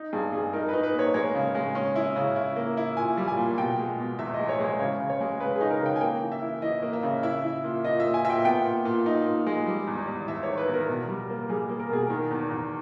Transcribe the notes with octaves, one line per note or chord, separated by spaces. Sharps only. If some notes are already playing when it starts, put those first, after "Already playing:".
Already playing: D#4
G2 G#4
G2 G#4
D#4 A#4
B4
D#4
B4
A#3
C#5
G#3 C#5
C#3
G#3
C#4
E4
C#3
E4
A#3
E4
A#2 G#5
G3
G#5
A#2
B2 G5
G#3
B2
E2 E5
D#5
G#3
C#5
G#3 C#5
C#3 C#5
C#3
C#5
G#3
C#3 B4
G#4
D#4
A#4
C#3 G5
G#5
A#3 G5
E3
E5
E4
E3 D#5
A#3
E5
C#3
E4 E5
E4
A#2
A#2 D#5
E5
A#2
G#5
A#2 E5
G5
B3 G5
A#2
A#2
D#4
A#2
G#3
G3
E2
E2
E2 E5
C#5
D#3
B4
E2
A#4
B2
G3
A#3
G3 G#4
A#3
A#4
B2 G#4
D#3 A#4
E2
E2